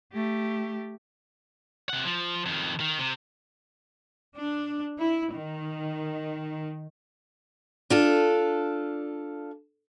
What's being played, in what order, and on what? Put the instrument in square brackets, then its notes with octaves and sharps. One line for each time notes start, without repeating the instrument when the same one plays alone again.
[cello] A3 G4
[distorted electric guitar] C3 F#5
F3
F2 D#3
D#3
C3
[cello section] D4
E4
D#3
[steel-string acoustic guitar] D4 F4 A4